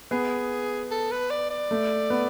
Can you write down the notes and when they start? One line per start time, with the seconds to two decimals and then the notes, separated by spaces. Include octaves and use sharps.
0.11 B3 G#4
0.91 A4
1.11 B4
1.30 D5
1.50 D5
1.71 A3
2.10 B3